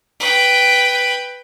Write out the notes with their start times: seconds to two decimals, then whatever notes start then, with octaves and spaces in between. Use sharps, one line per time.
0.20 B4 G5